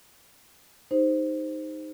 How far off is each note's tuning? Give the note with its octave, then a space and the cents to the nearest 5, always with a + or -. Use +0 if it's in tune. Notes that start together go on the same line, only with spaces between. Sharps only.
D#4 +0 G4 +45 C5 +0